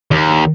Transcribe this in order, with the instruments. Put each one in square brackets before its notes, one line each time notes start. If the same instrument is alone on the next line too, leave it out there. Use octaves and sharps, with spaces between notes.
[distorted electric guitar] D#2